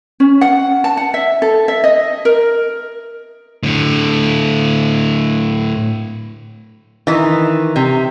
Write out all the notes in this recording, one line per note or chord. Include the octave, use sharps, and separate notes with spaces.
C#4
F#5
A5
F#5
E5
A4
E5
D#5
A#4
A2 D3
D#3 E3
C3